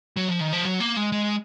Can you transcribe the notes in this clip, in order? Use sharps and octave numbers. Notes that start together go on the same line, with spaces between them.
F#3
F3
D#3
F3
F#3
A#3
G#3
G#3